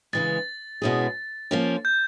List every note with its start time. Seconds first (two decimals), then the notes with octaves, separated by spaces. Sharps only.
0.13 C#3 E3 G#3 A6
0.82 B2 G#3 C#4 E4 G#4
1.51 F3 A#3 C#4
1.85 G6